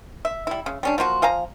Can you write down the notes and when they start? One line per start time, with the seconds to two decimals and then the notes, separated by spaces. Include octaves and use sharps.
0.25 E5
0.47 G3 E4
0.66 C#3
0.83 G3 C#4 D4
0.98 F3 A#3 F4 F#4
1.22 F3 F5 G#5 A#5